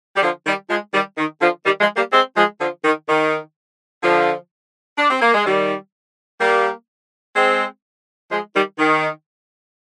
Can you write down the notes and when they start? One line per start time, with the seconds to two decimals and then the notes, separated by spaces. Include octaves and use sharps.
0.16 G3
0.23 D3 F3
0.46 D#3 G3
0.70 F3 G#3
0.94 D#3 G3
1.18 D#3
1.41 D3 F3
1.65 D#3 G3
1.81 F3 G#3
1.97 G3 A#3
2.13 G#3 C4
2.37 F3 G#3
2.60 D3 F3
2.84 D#3
3.08 D#3
4.03 D3 F3
4.98 D4
5.10 C4
5.22 A#3
5.34 G#3
5.46 D#3 G3
6.41 G3 A#3
7.36 G#3 C4
8.31 F3 G#3
8.55 D#3 G3
8.79 D#3